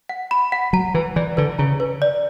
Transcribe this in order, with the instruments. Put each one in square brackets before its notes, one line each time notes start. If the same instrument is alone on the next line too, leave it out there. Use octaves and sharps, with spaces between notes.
[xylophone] F#5
B5
F#5
[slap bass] F#3 [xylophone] A#5
[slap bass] E3 [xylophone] B4
[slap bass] E3 [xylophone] D5
[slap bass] D3 [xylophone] B4
[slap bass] C#3 [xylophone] A#5
[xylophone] B4
D5